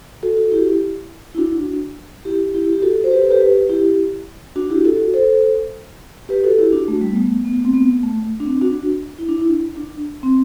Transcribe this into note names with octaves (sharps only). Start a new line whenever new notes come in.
F#4 A4
F#4 A4
E4 G4
E4
D4 F#4
E4 G4
E4 G4
G4
F#4 A4
C5
G4 B4
A4 C5
G4 B4
G4 B4
E4 G4
D4 F#4
E4 G4
F#4 A4
A4 C5
G4 B4
F#4 A4
E4 G4
D4 F#4
A3
G3
B3
A3
B3
A3
C4
B3
A3
D4
C4
D4 F#4
E4
D4
E4
D4
C4